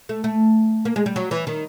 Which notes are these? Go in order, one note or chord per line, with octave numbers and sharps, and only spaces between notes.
A3
A3
A#3
G#3
G3
F#3
E3
D#3